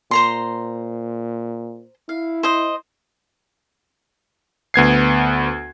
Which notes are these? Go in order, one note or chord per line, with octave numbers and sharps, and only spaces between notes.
A#2 C5 A#5 C6
E4 F5
C5 D#5
D2 B3 G#6 C7